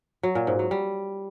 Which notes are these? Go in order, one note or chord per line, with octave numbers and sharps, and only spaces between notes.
F#3
A#2
G#2
F#3
G3